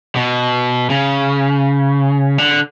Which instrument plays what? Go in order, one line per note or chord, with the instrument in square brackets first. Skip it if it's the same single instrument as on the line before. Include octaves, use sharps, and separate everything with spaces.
[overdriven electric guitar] B2
C#3
D3